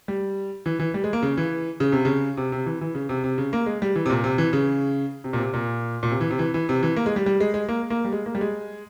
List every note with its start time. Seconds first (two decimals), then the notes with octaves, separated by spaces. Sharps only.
0.08 G3
0.66 E3
0.79 E3
0.94 G3
1.04 G#3
1.13 A#3
1.23 C#3
1.37 E3
1.80 C#3
1.92 C3
2.05 C#3
2.37 C3
2.52 C3
2.66 E3
2.81 E3
2.95 C#3
3.09 C3
3.24 C3
3.38 C#3
3.53 A#3
3.66 G#3
3.82 G3
3.96 E3
4.06 C3
4.10 A#2
4.24 C3
4.38 E3
4.53 C#3
5.24 C3
5.33 A#2
5.39 C3
5.54 A#2
6.03 A#2
6.11 C3
6.21 E3
6.31 C3
6.39 E3
6.54 E3
6.69 C3
6.83 E3
6.96 A#3
7.06 G#3
7.16 G3
7.26 G3
7.40 G#3
7.54 G#3
7.69 A#3
7.90 A#3
8.05 G3
8.12 G#3
8.26 A#3
8.35 G3
8.41 G#3